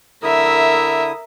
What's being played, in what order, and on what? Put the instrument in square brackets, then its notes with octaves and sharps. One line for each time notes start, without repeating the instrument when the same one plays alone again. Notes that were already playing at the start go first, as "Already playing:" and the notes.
[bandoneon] D3 E4 D#6 [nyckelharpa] A#4 E5